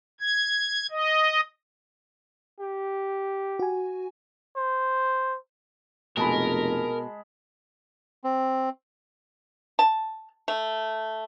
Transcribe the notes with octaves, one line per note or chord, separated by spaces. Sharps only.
G#6
D#5
G4
F#4 G#5
C5
F1 B2 G#3 A#4 A5 B5
C4
A5
A3